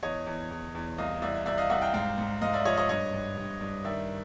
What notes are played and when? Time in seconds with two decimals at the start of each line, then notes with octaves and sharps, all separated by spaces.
0.03 E2 C#5 D#5
0.26 E2
0.51 E2
0.75 E2
0.98 C2 D#5 F5
1.22 C2 D5 E5
1.46 C2 D5 E5
1.58 D#5 F5
1.70 C2 E5 F#5
1.82 F5 G5
1.94 G#2 F5 G5
2.18 G#2
2.42 G#2 D#5 F5
2.54 D5 E5
2.65 F3 C#5 D#5
2.77 C#5 D#5
2.89 G2 C#5 D#5
3.13 G2
3.37 G2
3.61 G2
3.85 D#3 D5 E5